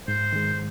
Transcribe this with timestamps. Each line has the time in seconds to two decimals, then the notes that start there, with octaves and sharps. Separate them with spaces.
0.07 G#2 C5
0.33 D#3 G#3